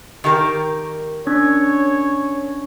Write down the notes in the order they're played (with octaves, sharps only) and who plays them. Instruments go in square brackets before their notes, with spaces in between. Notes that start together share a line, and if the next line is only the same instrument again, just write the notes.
[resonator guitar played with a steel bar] D#3 G4 A#4
[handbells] C#4 D4 G#6 [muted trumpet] C#5